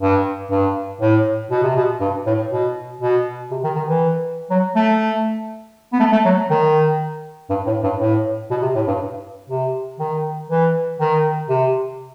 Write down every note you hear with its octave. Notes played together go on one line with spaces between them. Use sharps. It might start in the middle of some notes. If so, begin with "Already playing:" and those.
G2
G2
A2
B2
C3
B2
G2
A2
B2
B2
C3
D#3
D#3
E3
F#3
A3
B3
A3
A3
F#3
D#3
G2
A2
G2
A2
B2
C3
A2
G2
C3
D#3
E3
D#3
C3